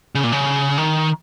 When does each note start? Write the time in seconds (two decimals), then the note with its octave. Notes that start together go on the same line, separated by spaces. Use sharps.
0.15 C#3
0.23 A#2
0.32 C#3
0.78 D#3